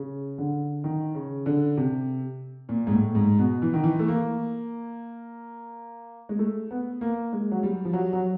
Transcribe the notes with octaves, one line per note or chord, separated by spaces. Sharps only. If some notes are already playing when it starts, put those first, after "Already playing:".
Already playing: C#3
D3
D#3
C#3
D3
C3
A#2
G#2
A2
G#2
B2
E3
D#3
E3
A3
A#3
G#3
A3
B3
A#3
G#3
F#3
G3
F3
F#3
F#3